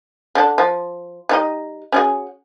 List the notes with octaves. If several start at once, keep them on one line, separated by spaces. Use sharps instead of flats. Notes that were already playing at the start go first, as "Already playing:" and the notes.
D3 D4
F3
G3 D#4 D#5
C#4 F#4 G#4